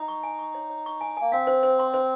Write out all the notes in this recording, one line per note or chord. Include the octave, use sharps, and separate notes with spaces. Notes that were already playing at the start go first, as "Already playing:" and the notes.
Already playing: D#4
C#6
G#5
C#6
C#5
C#5
C#6
G#5
A#3 G#5
C4 F5
C5
C5
C6
C5